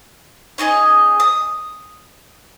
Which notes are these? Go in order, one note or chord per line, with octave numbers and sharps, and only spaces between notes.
C#4 D#4 G#4 D#5
D#6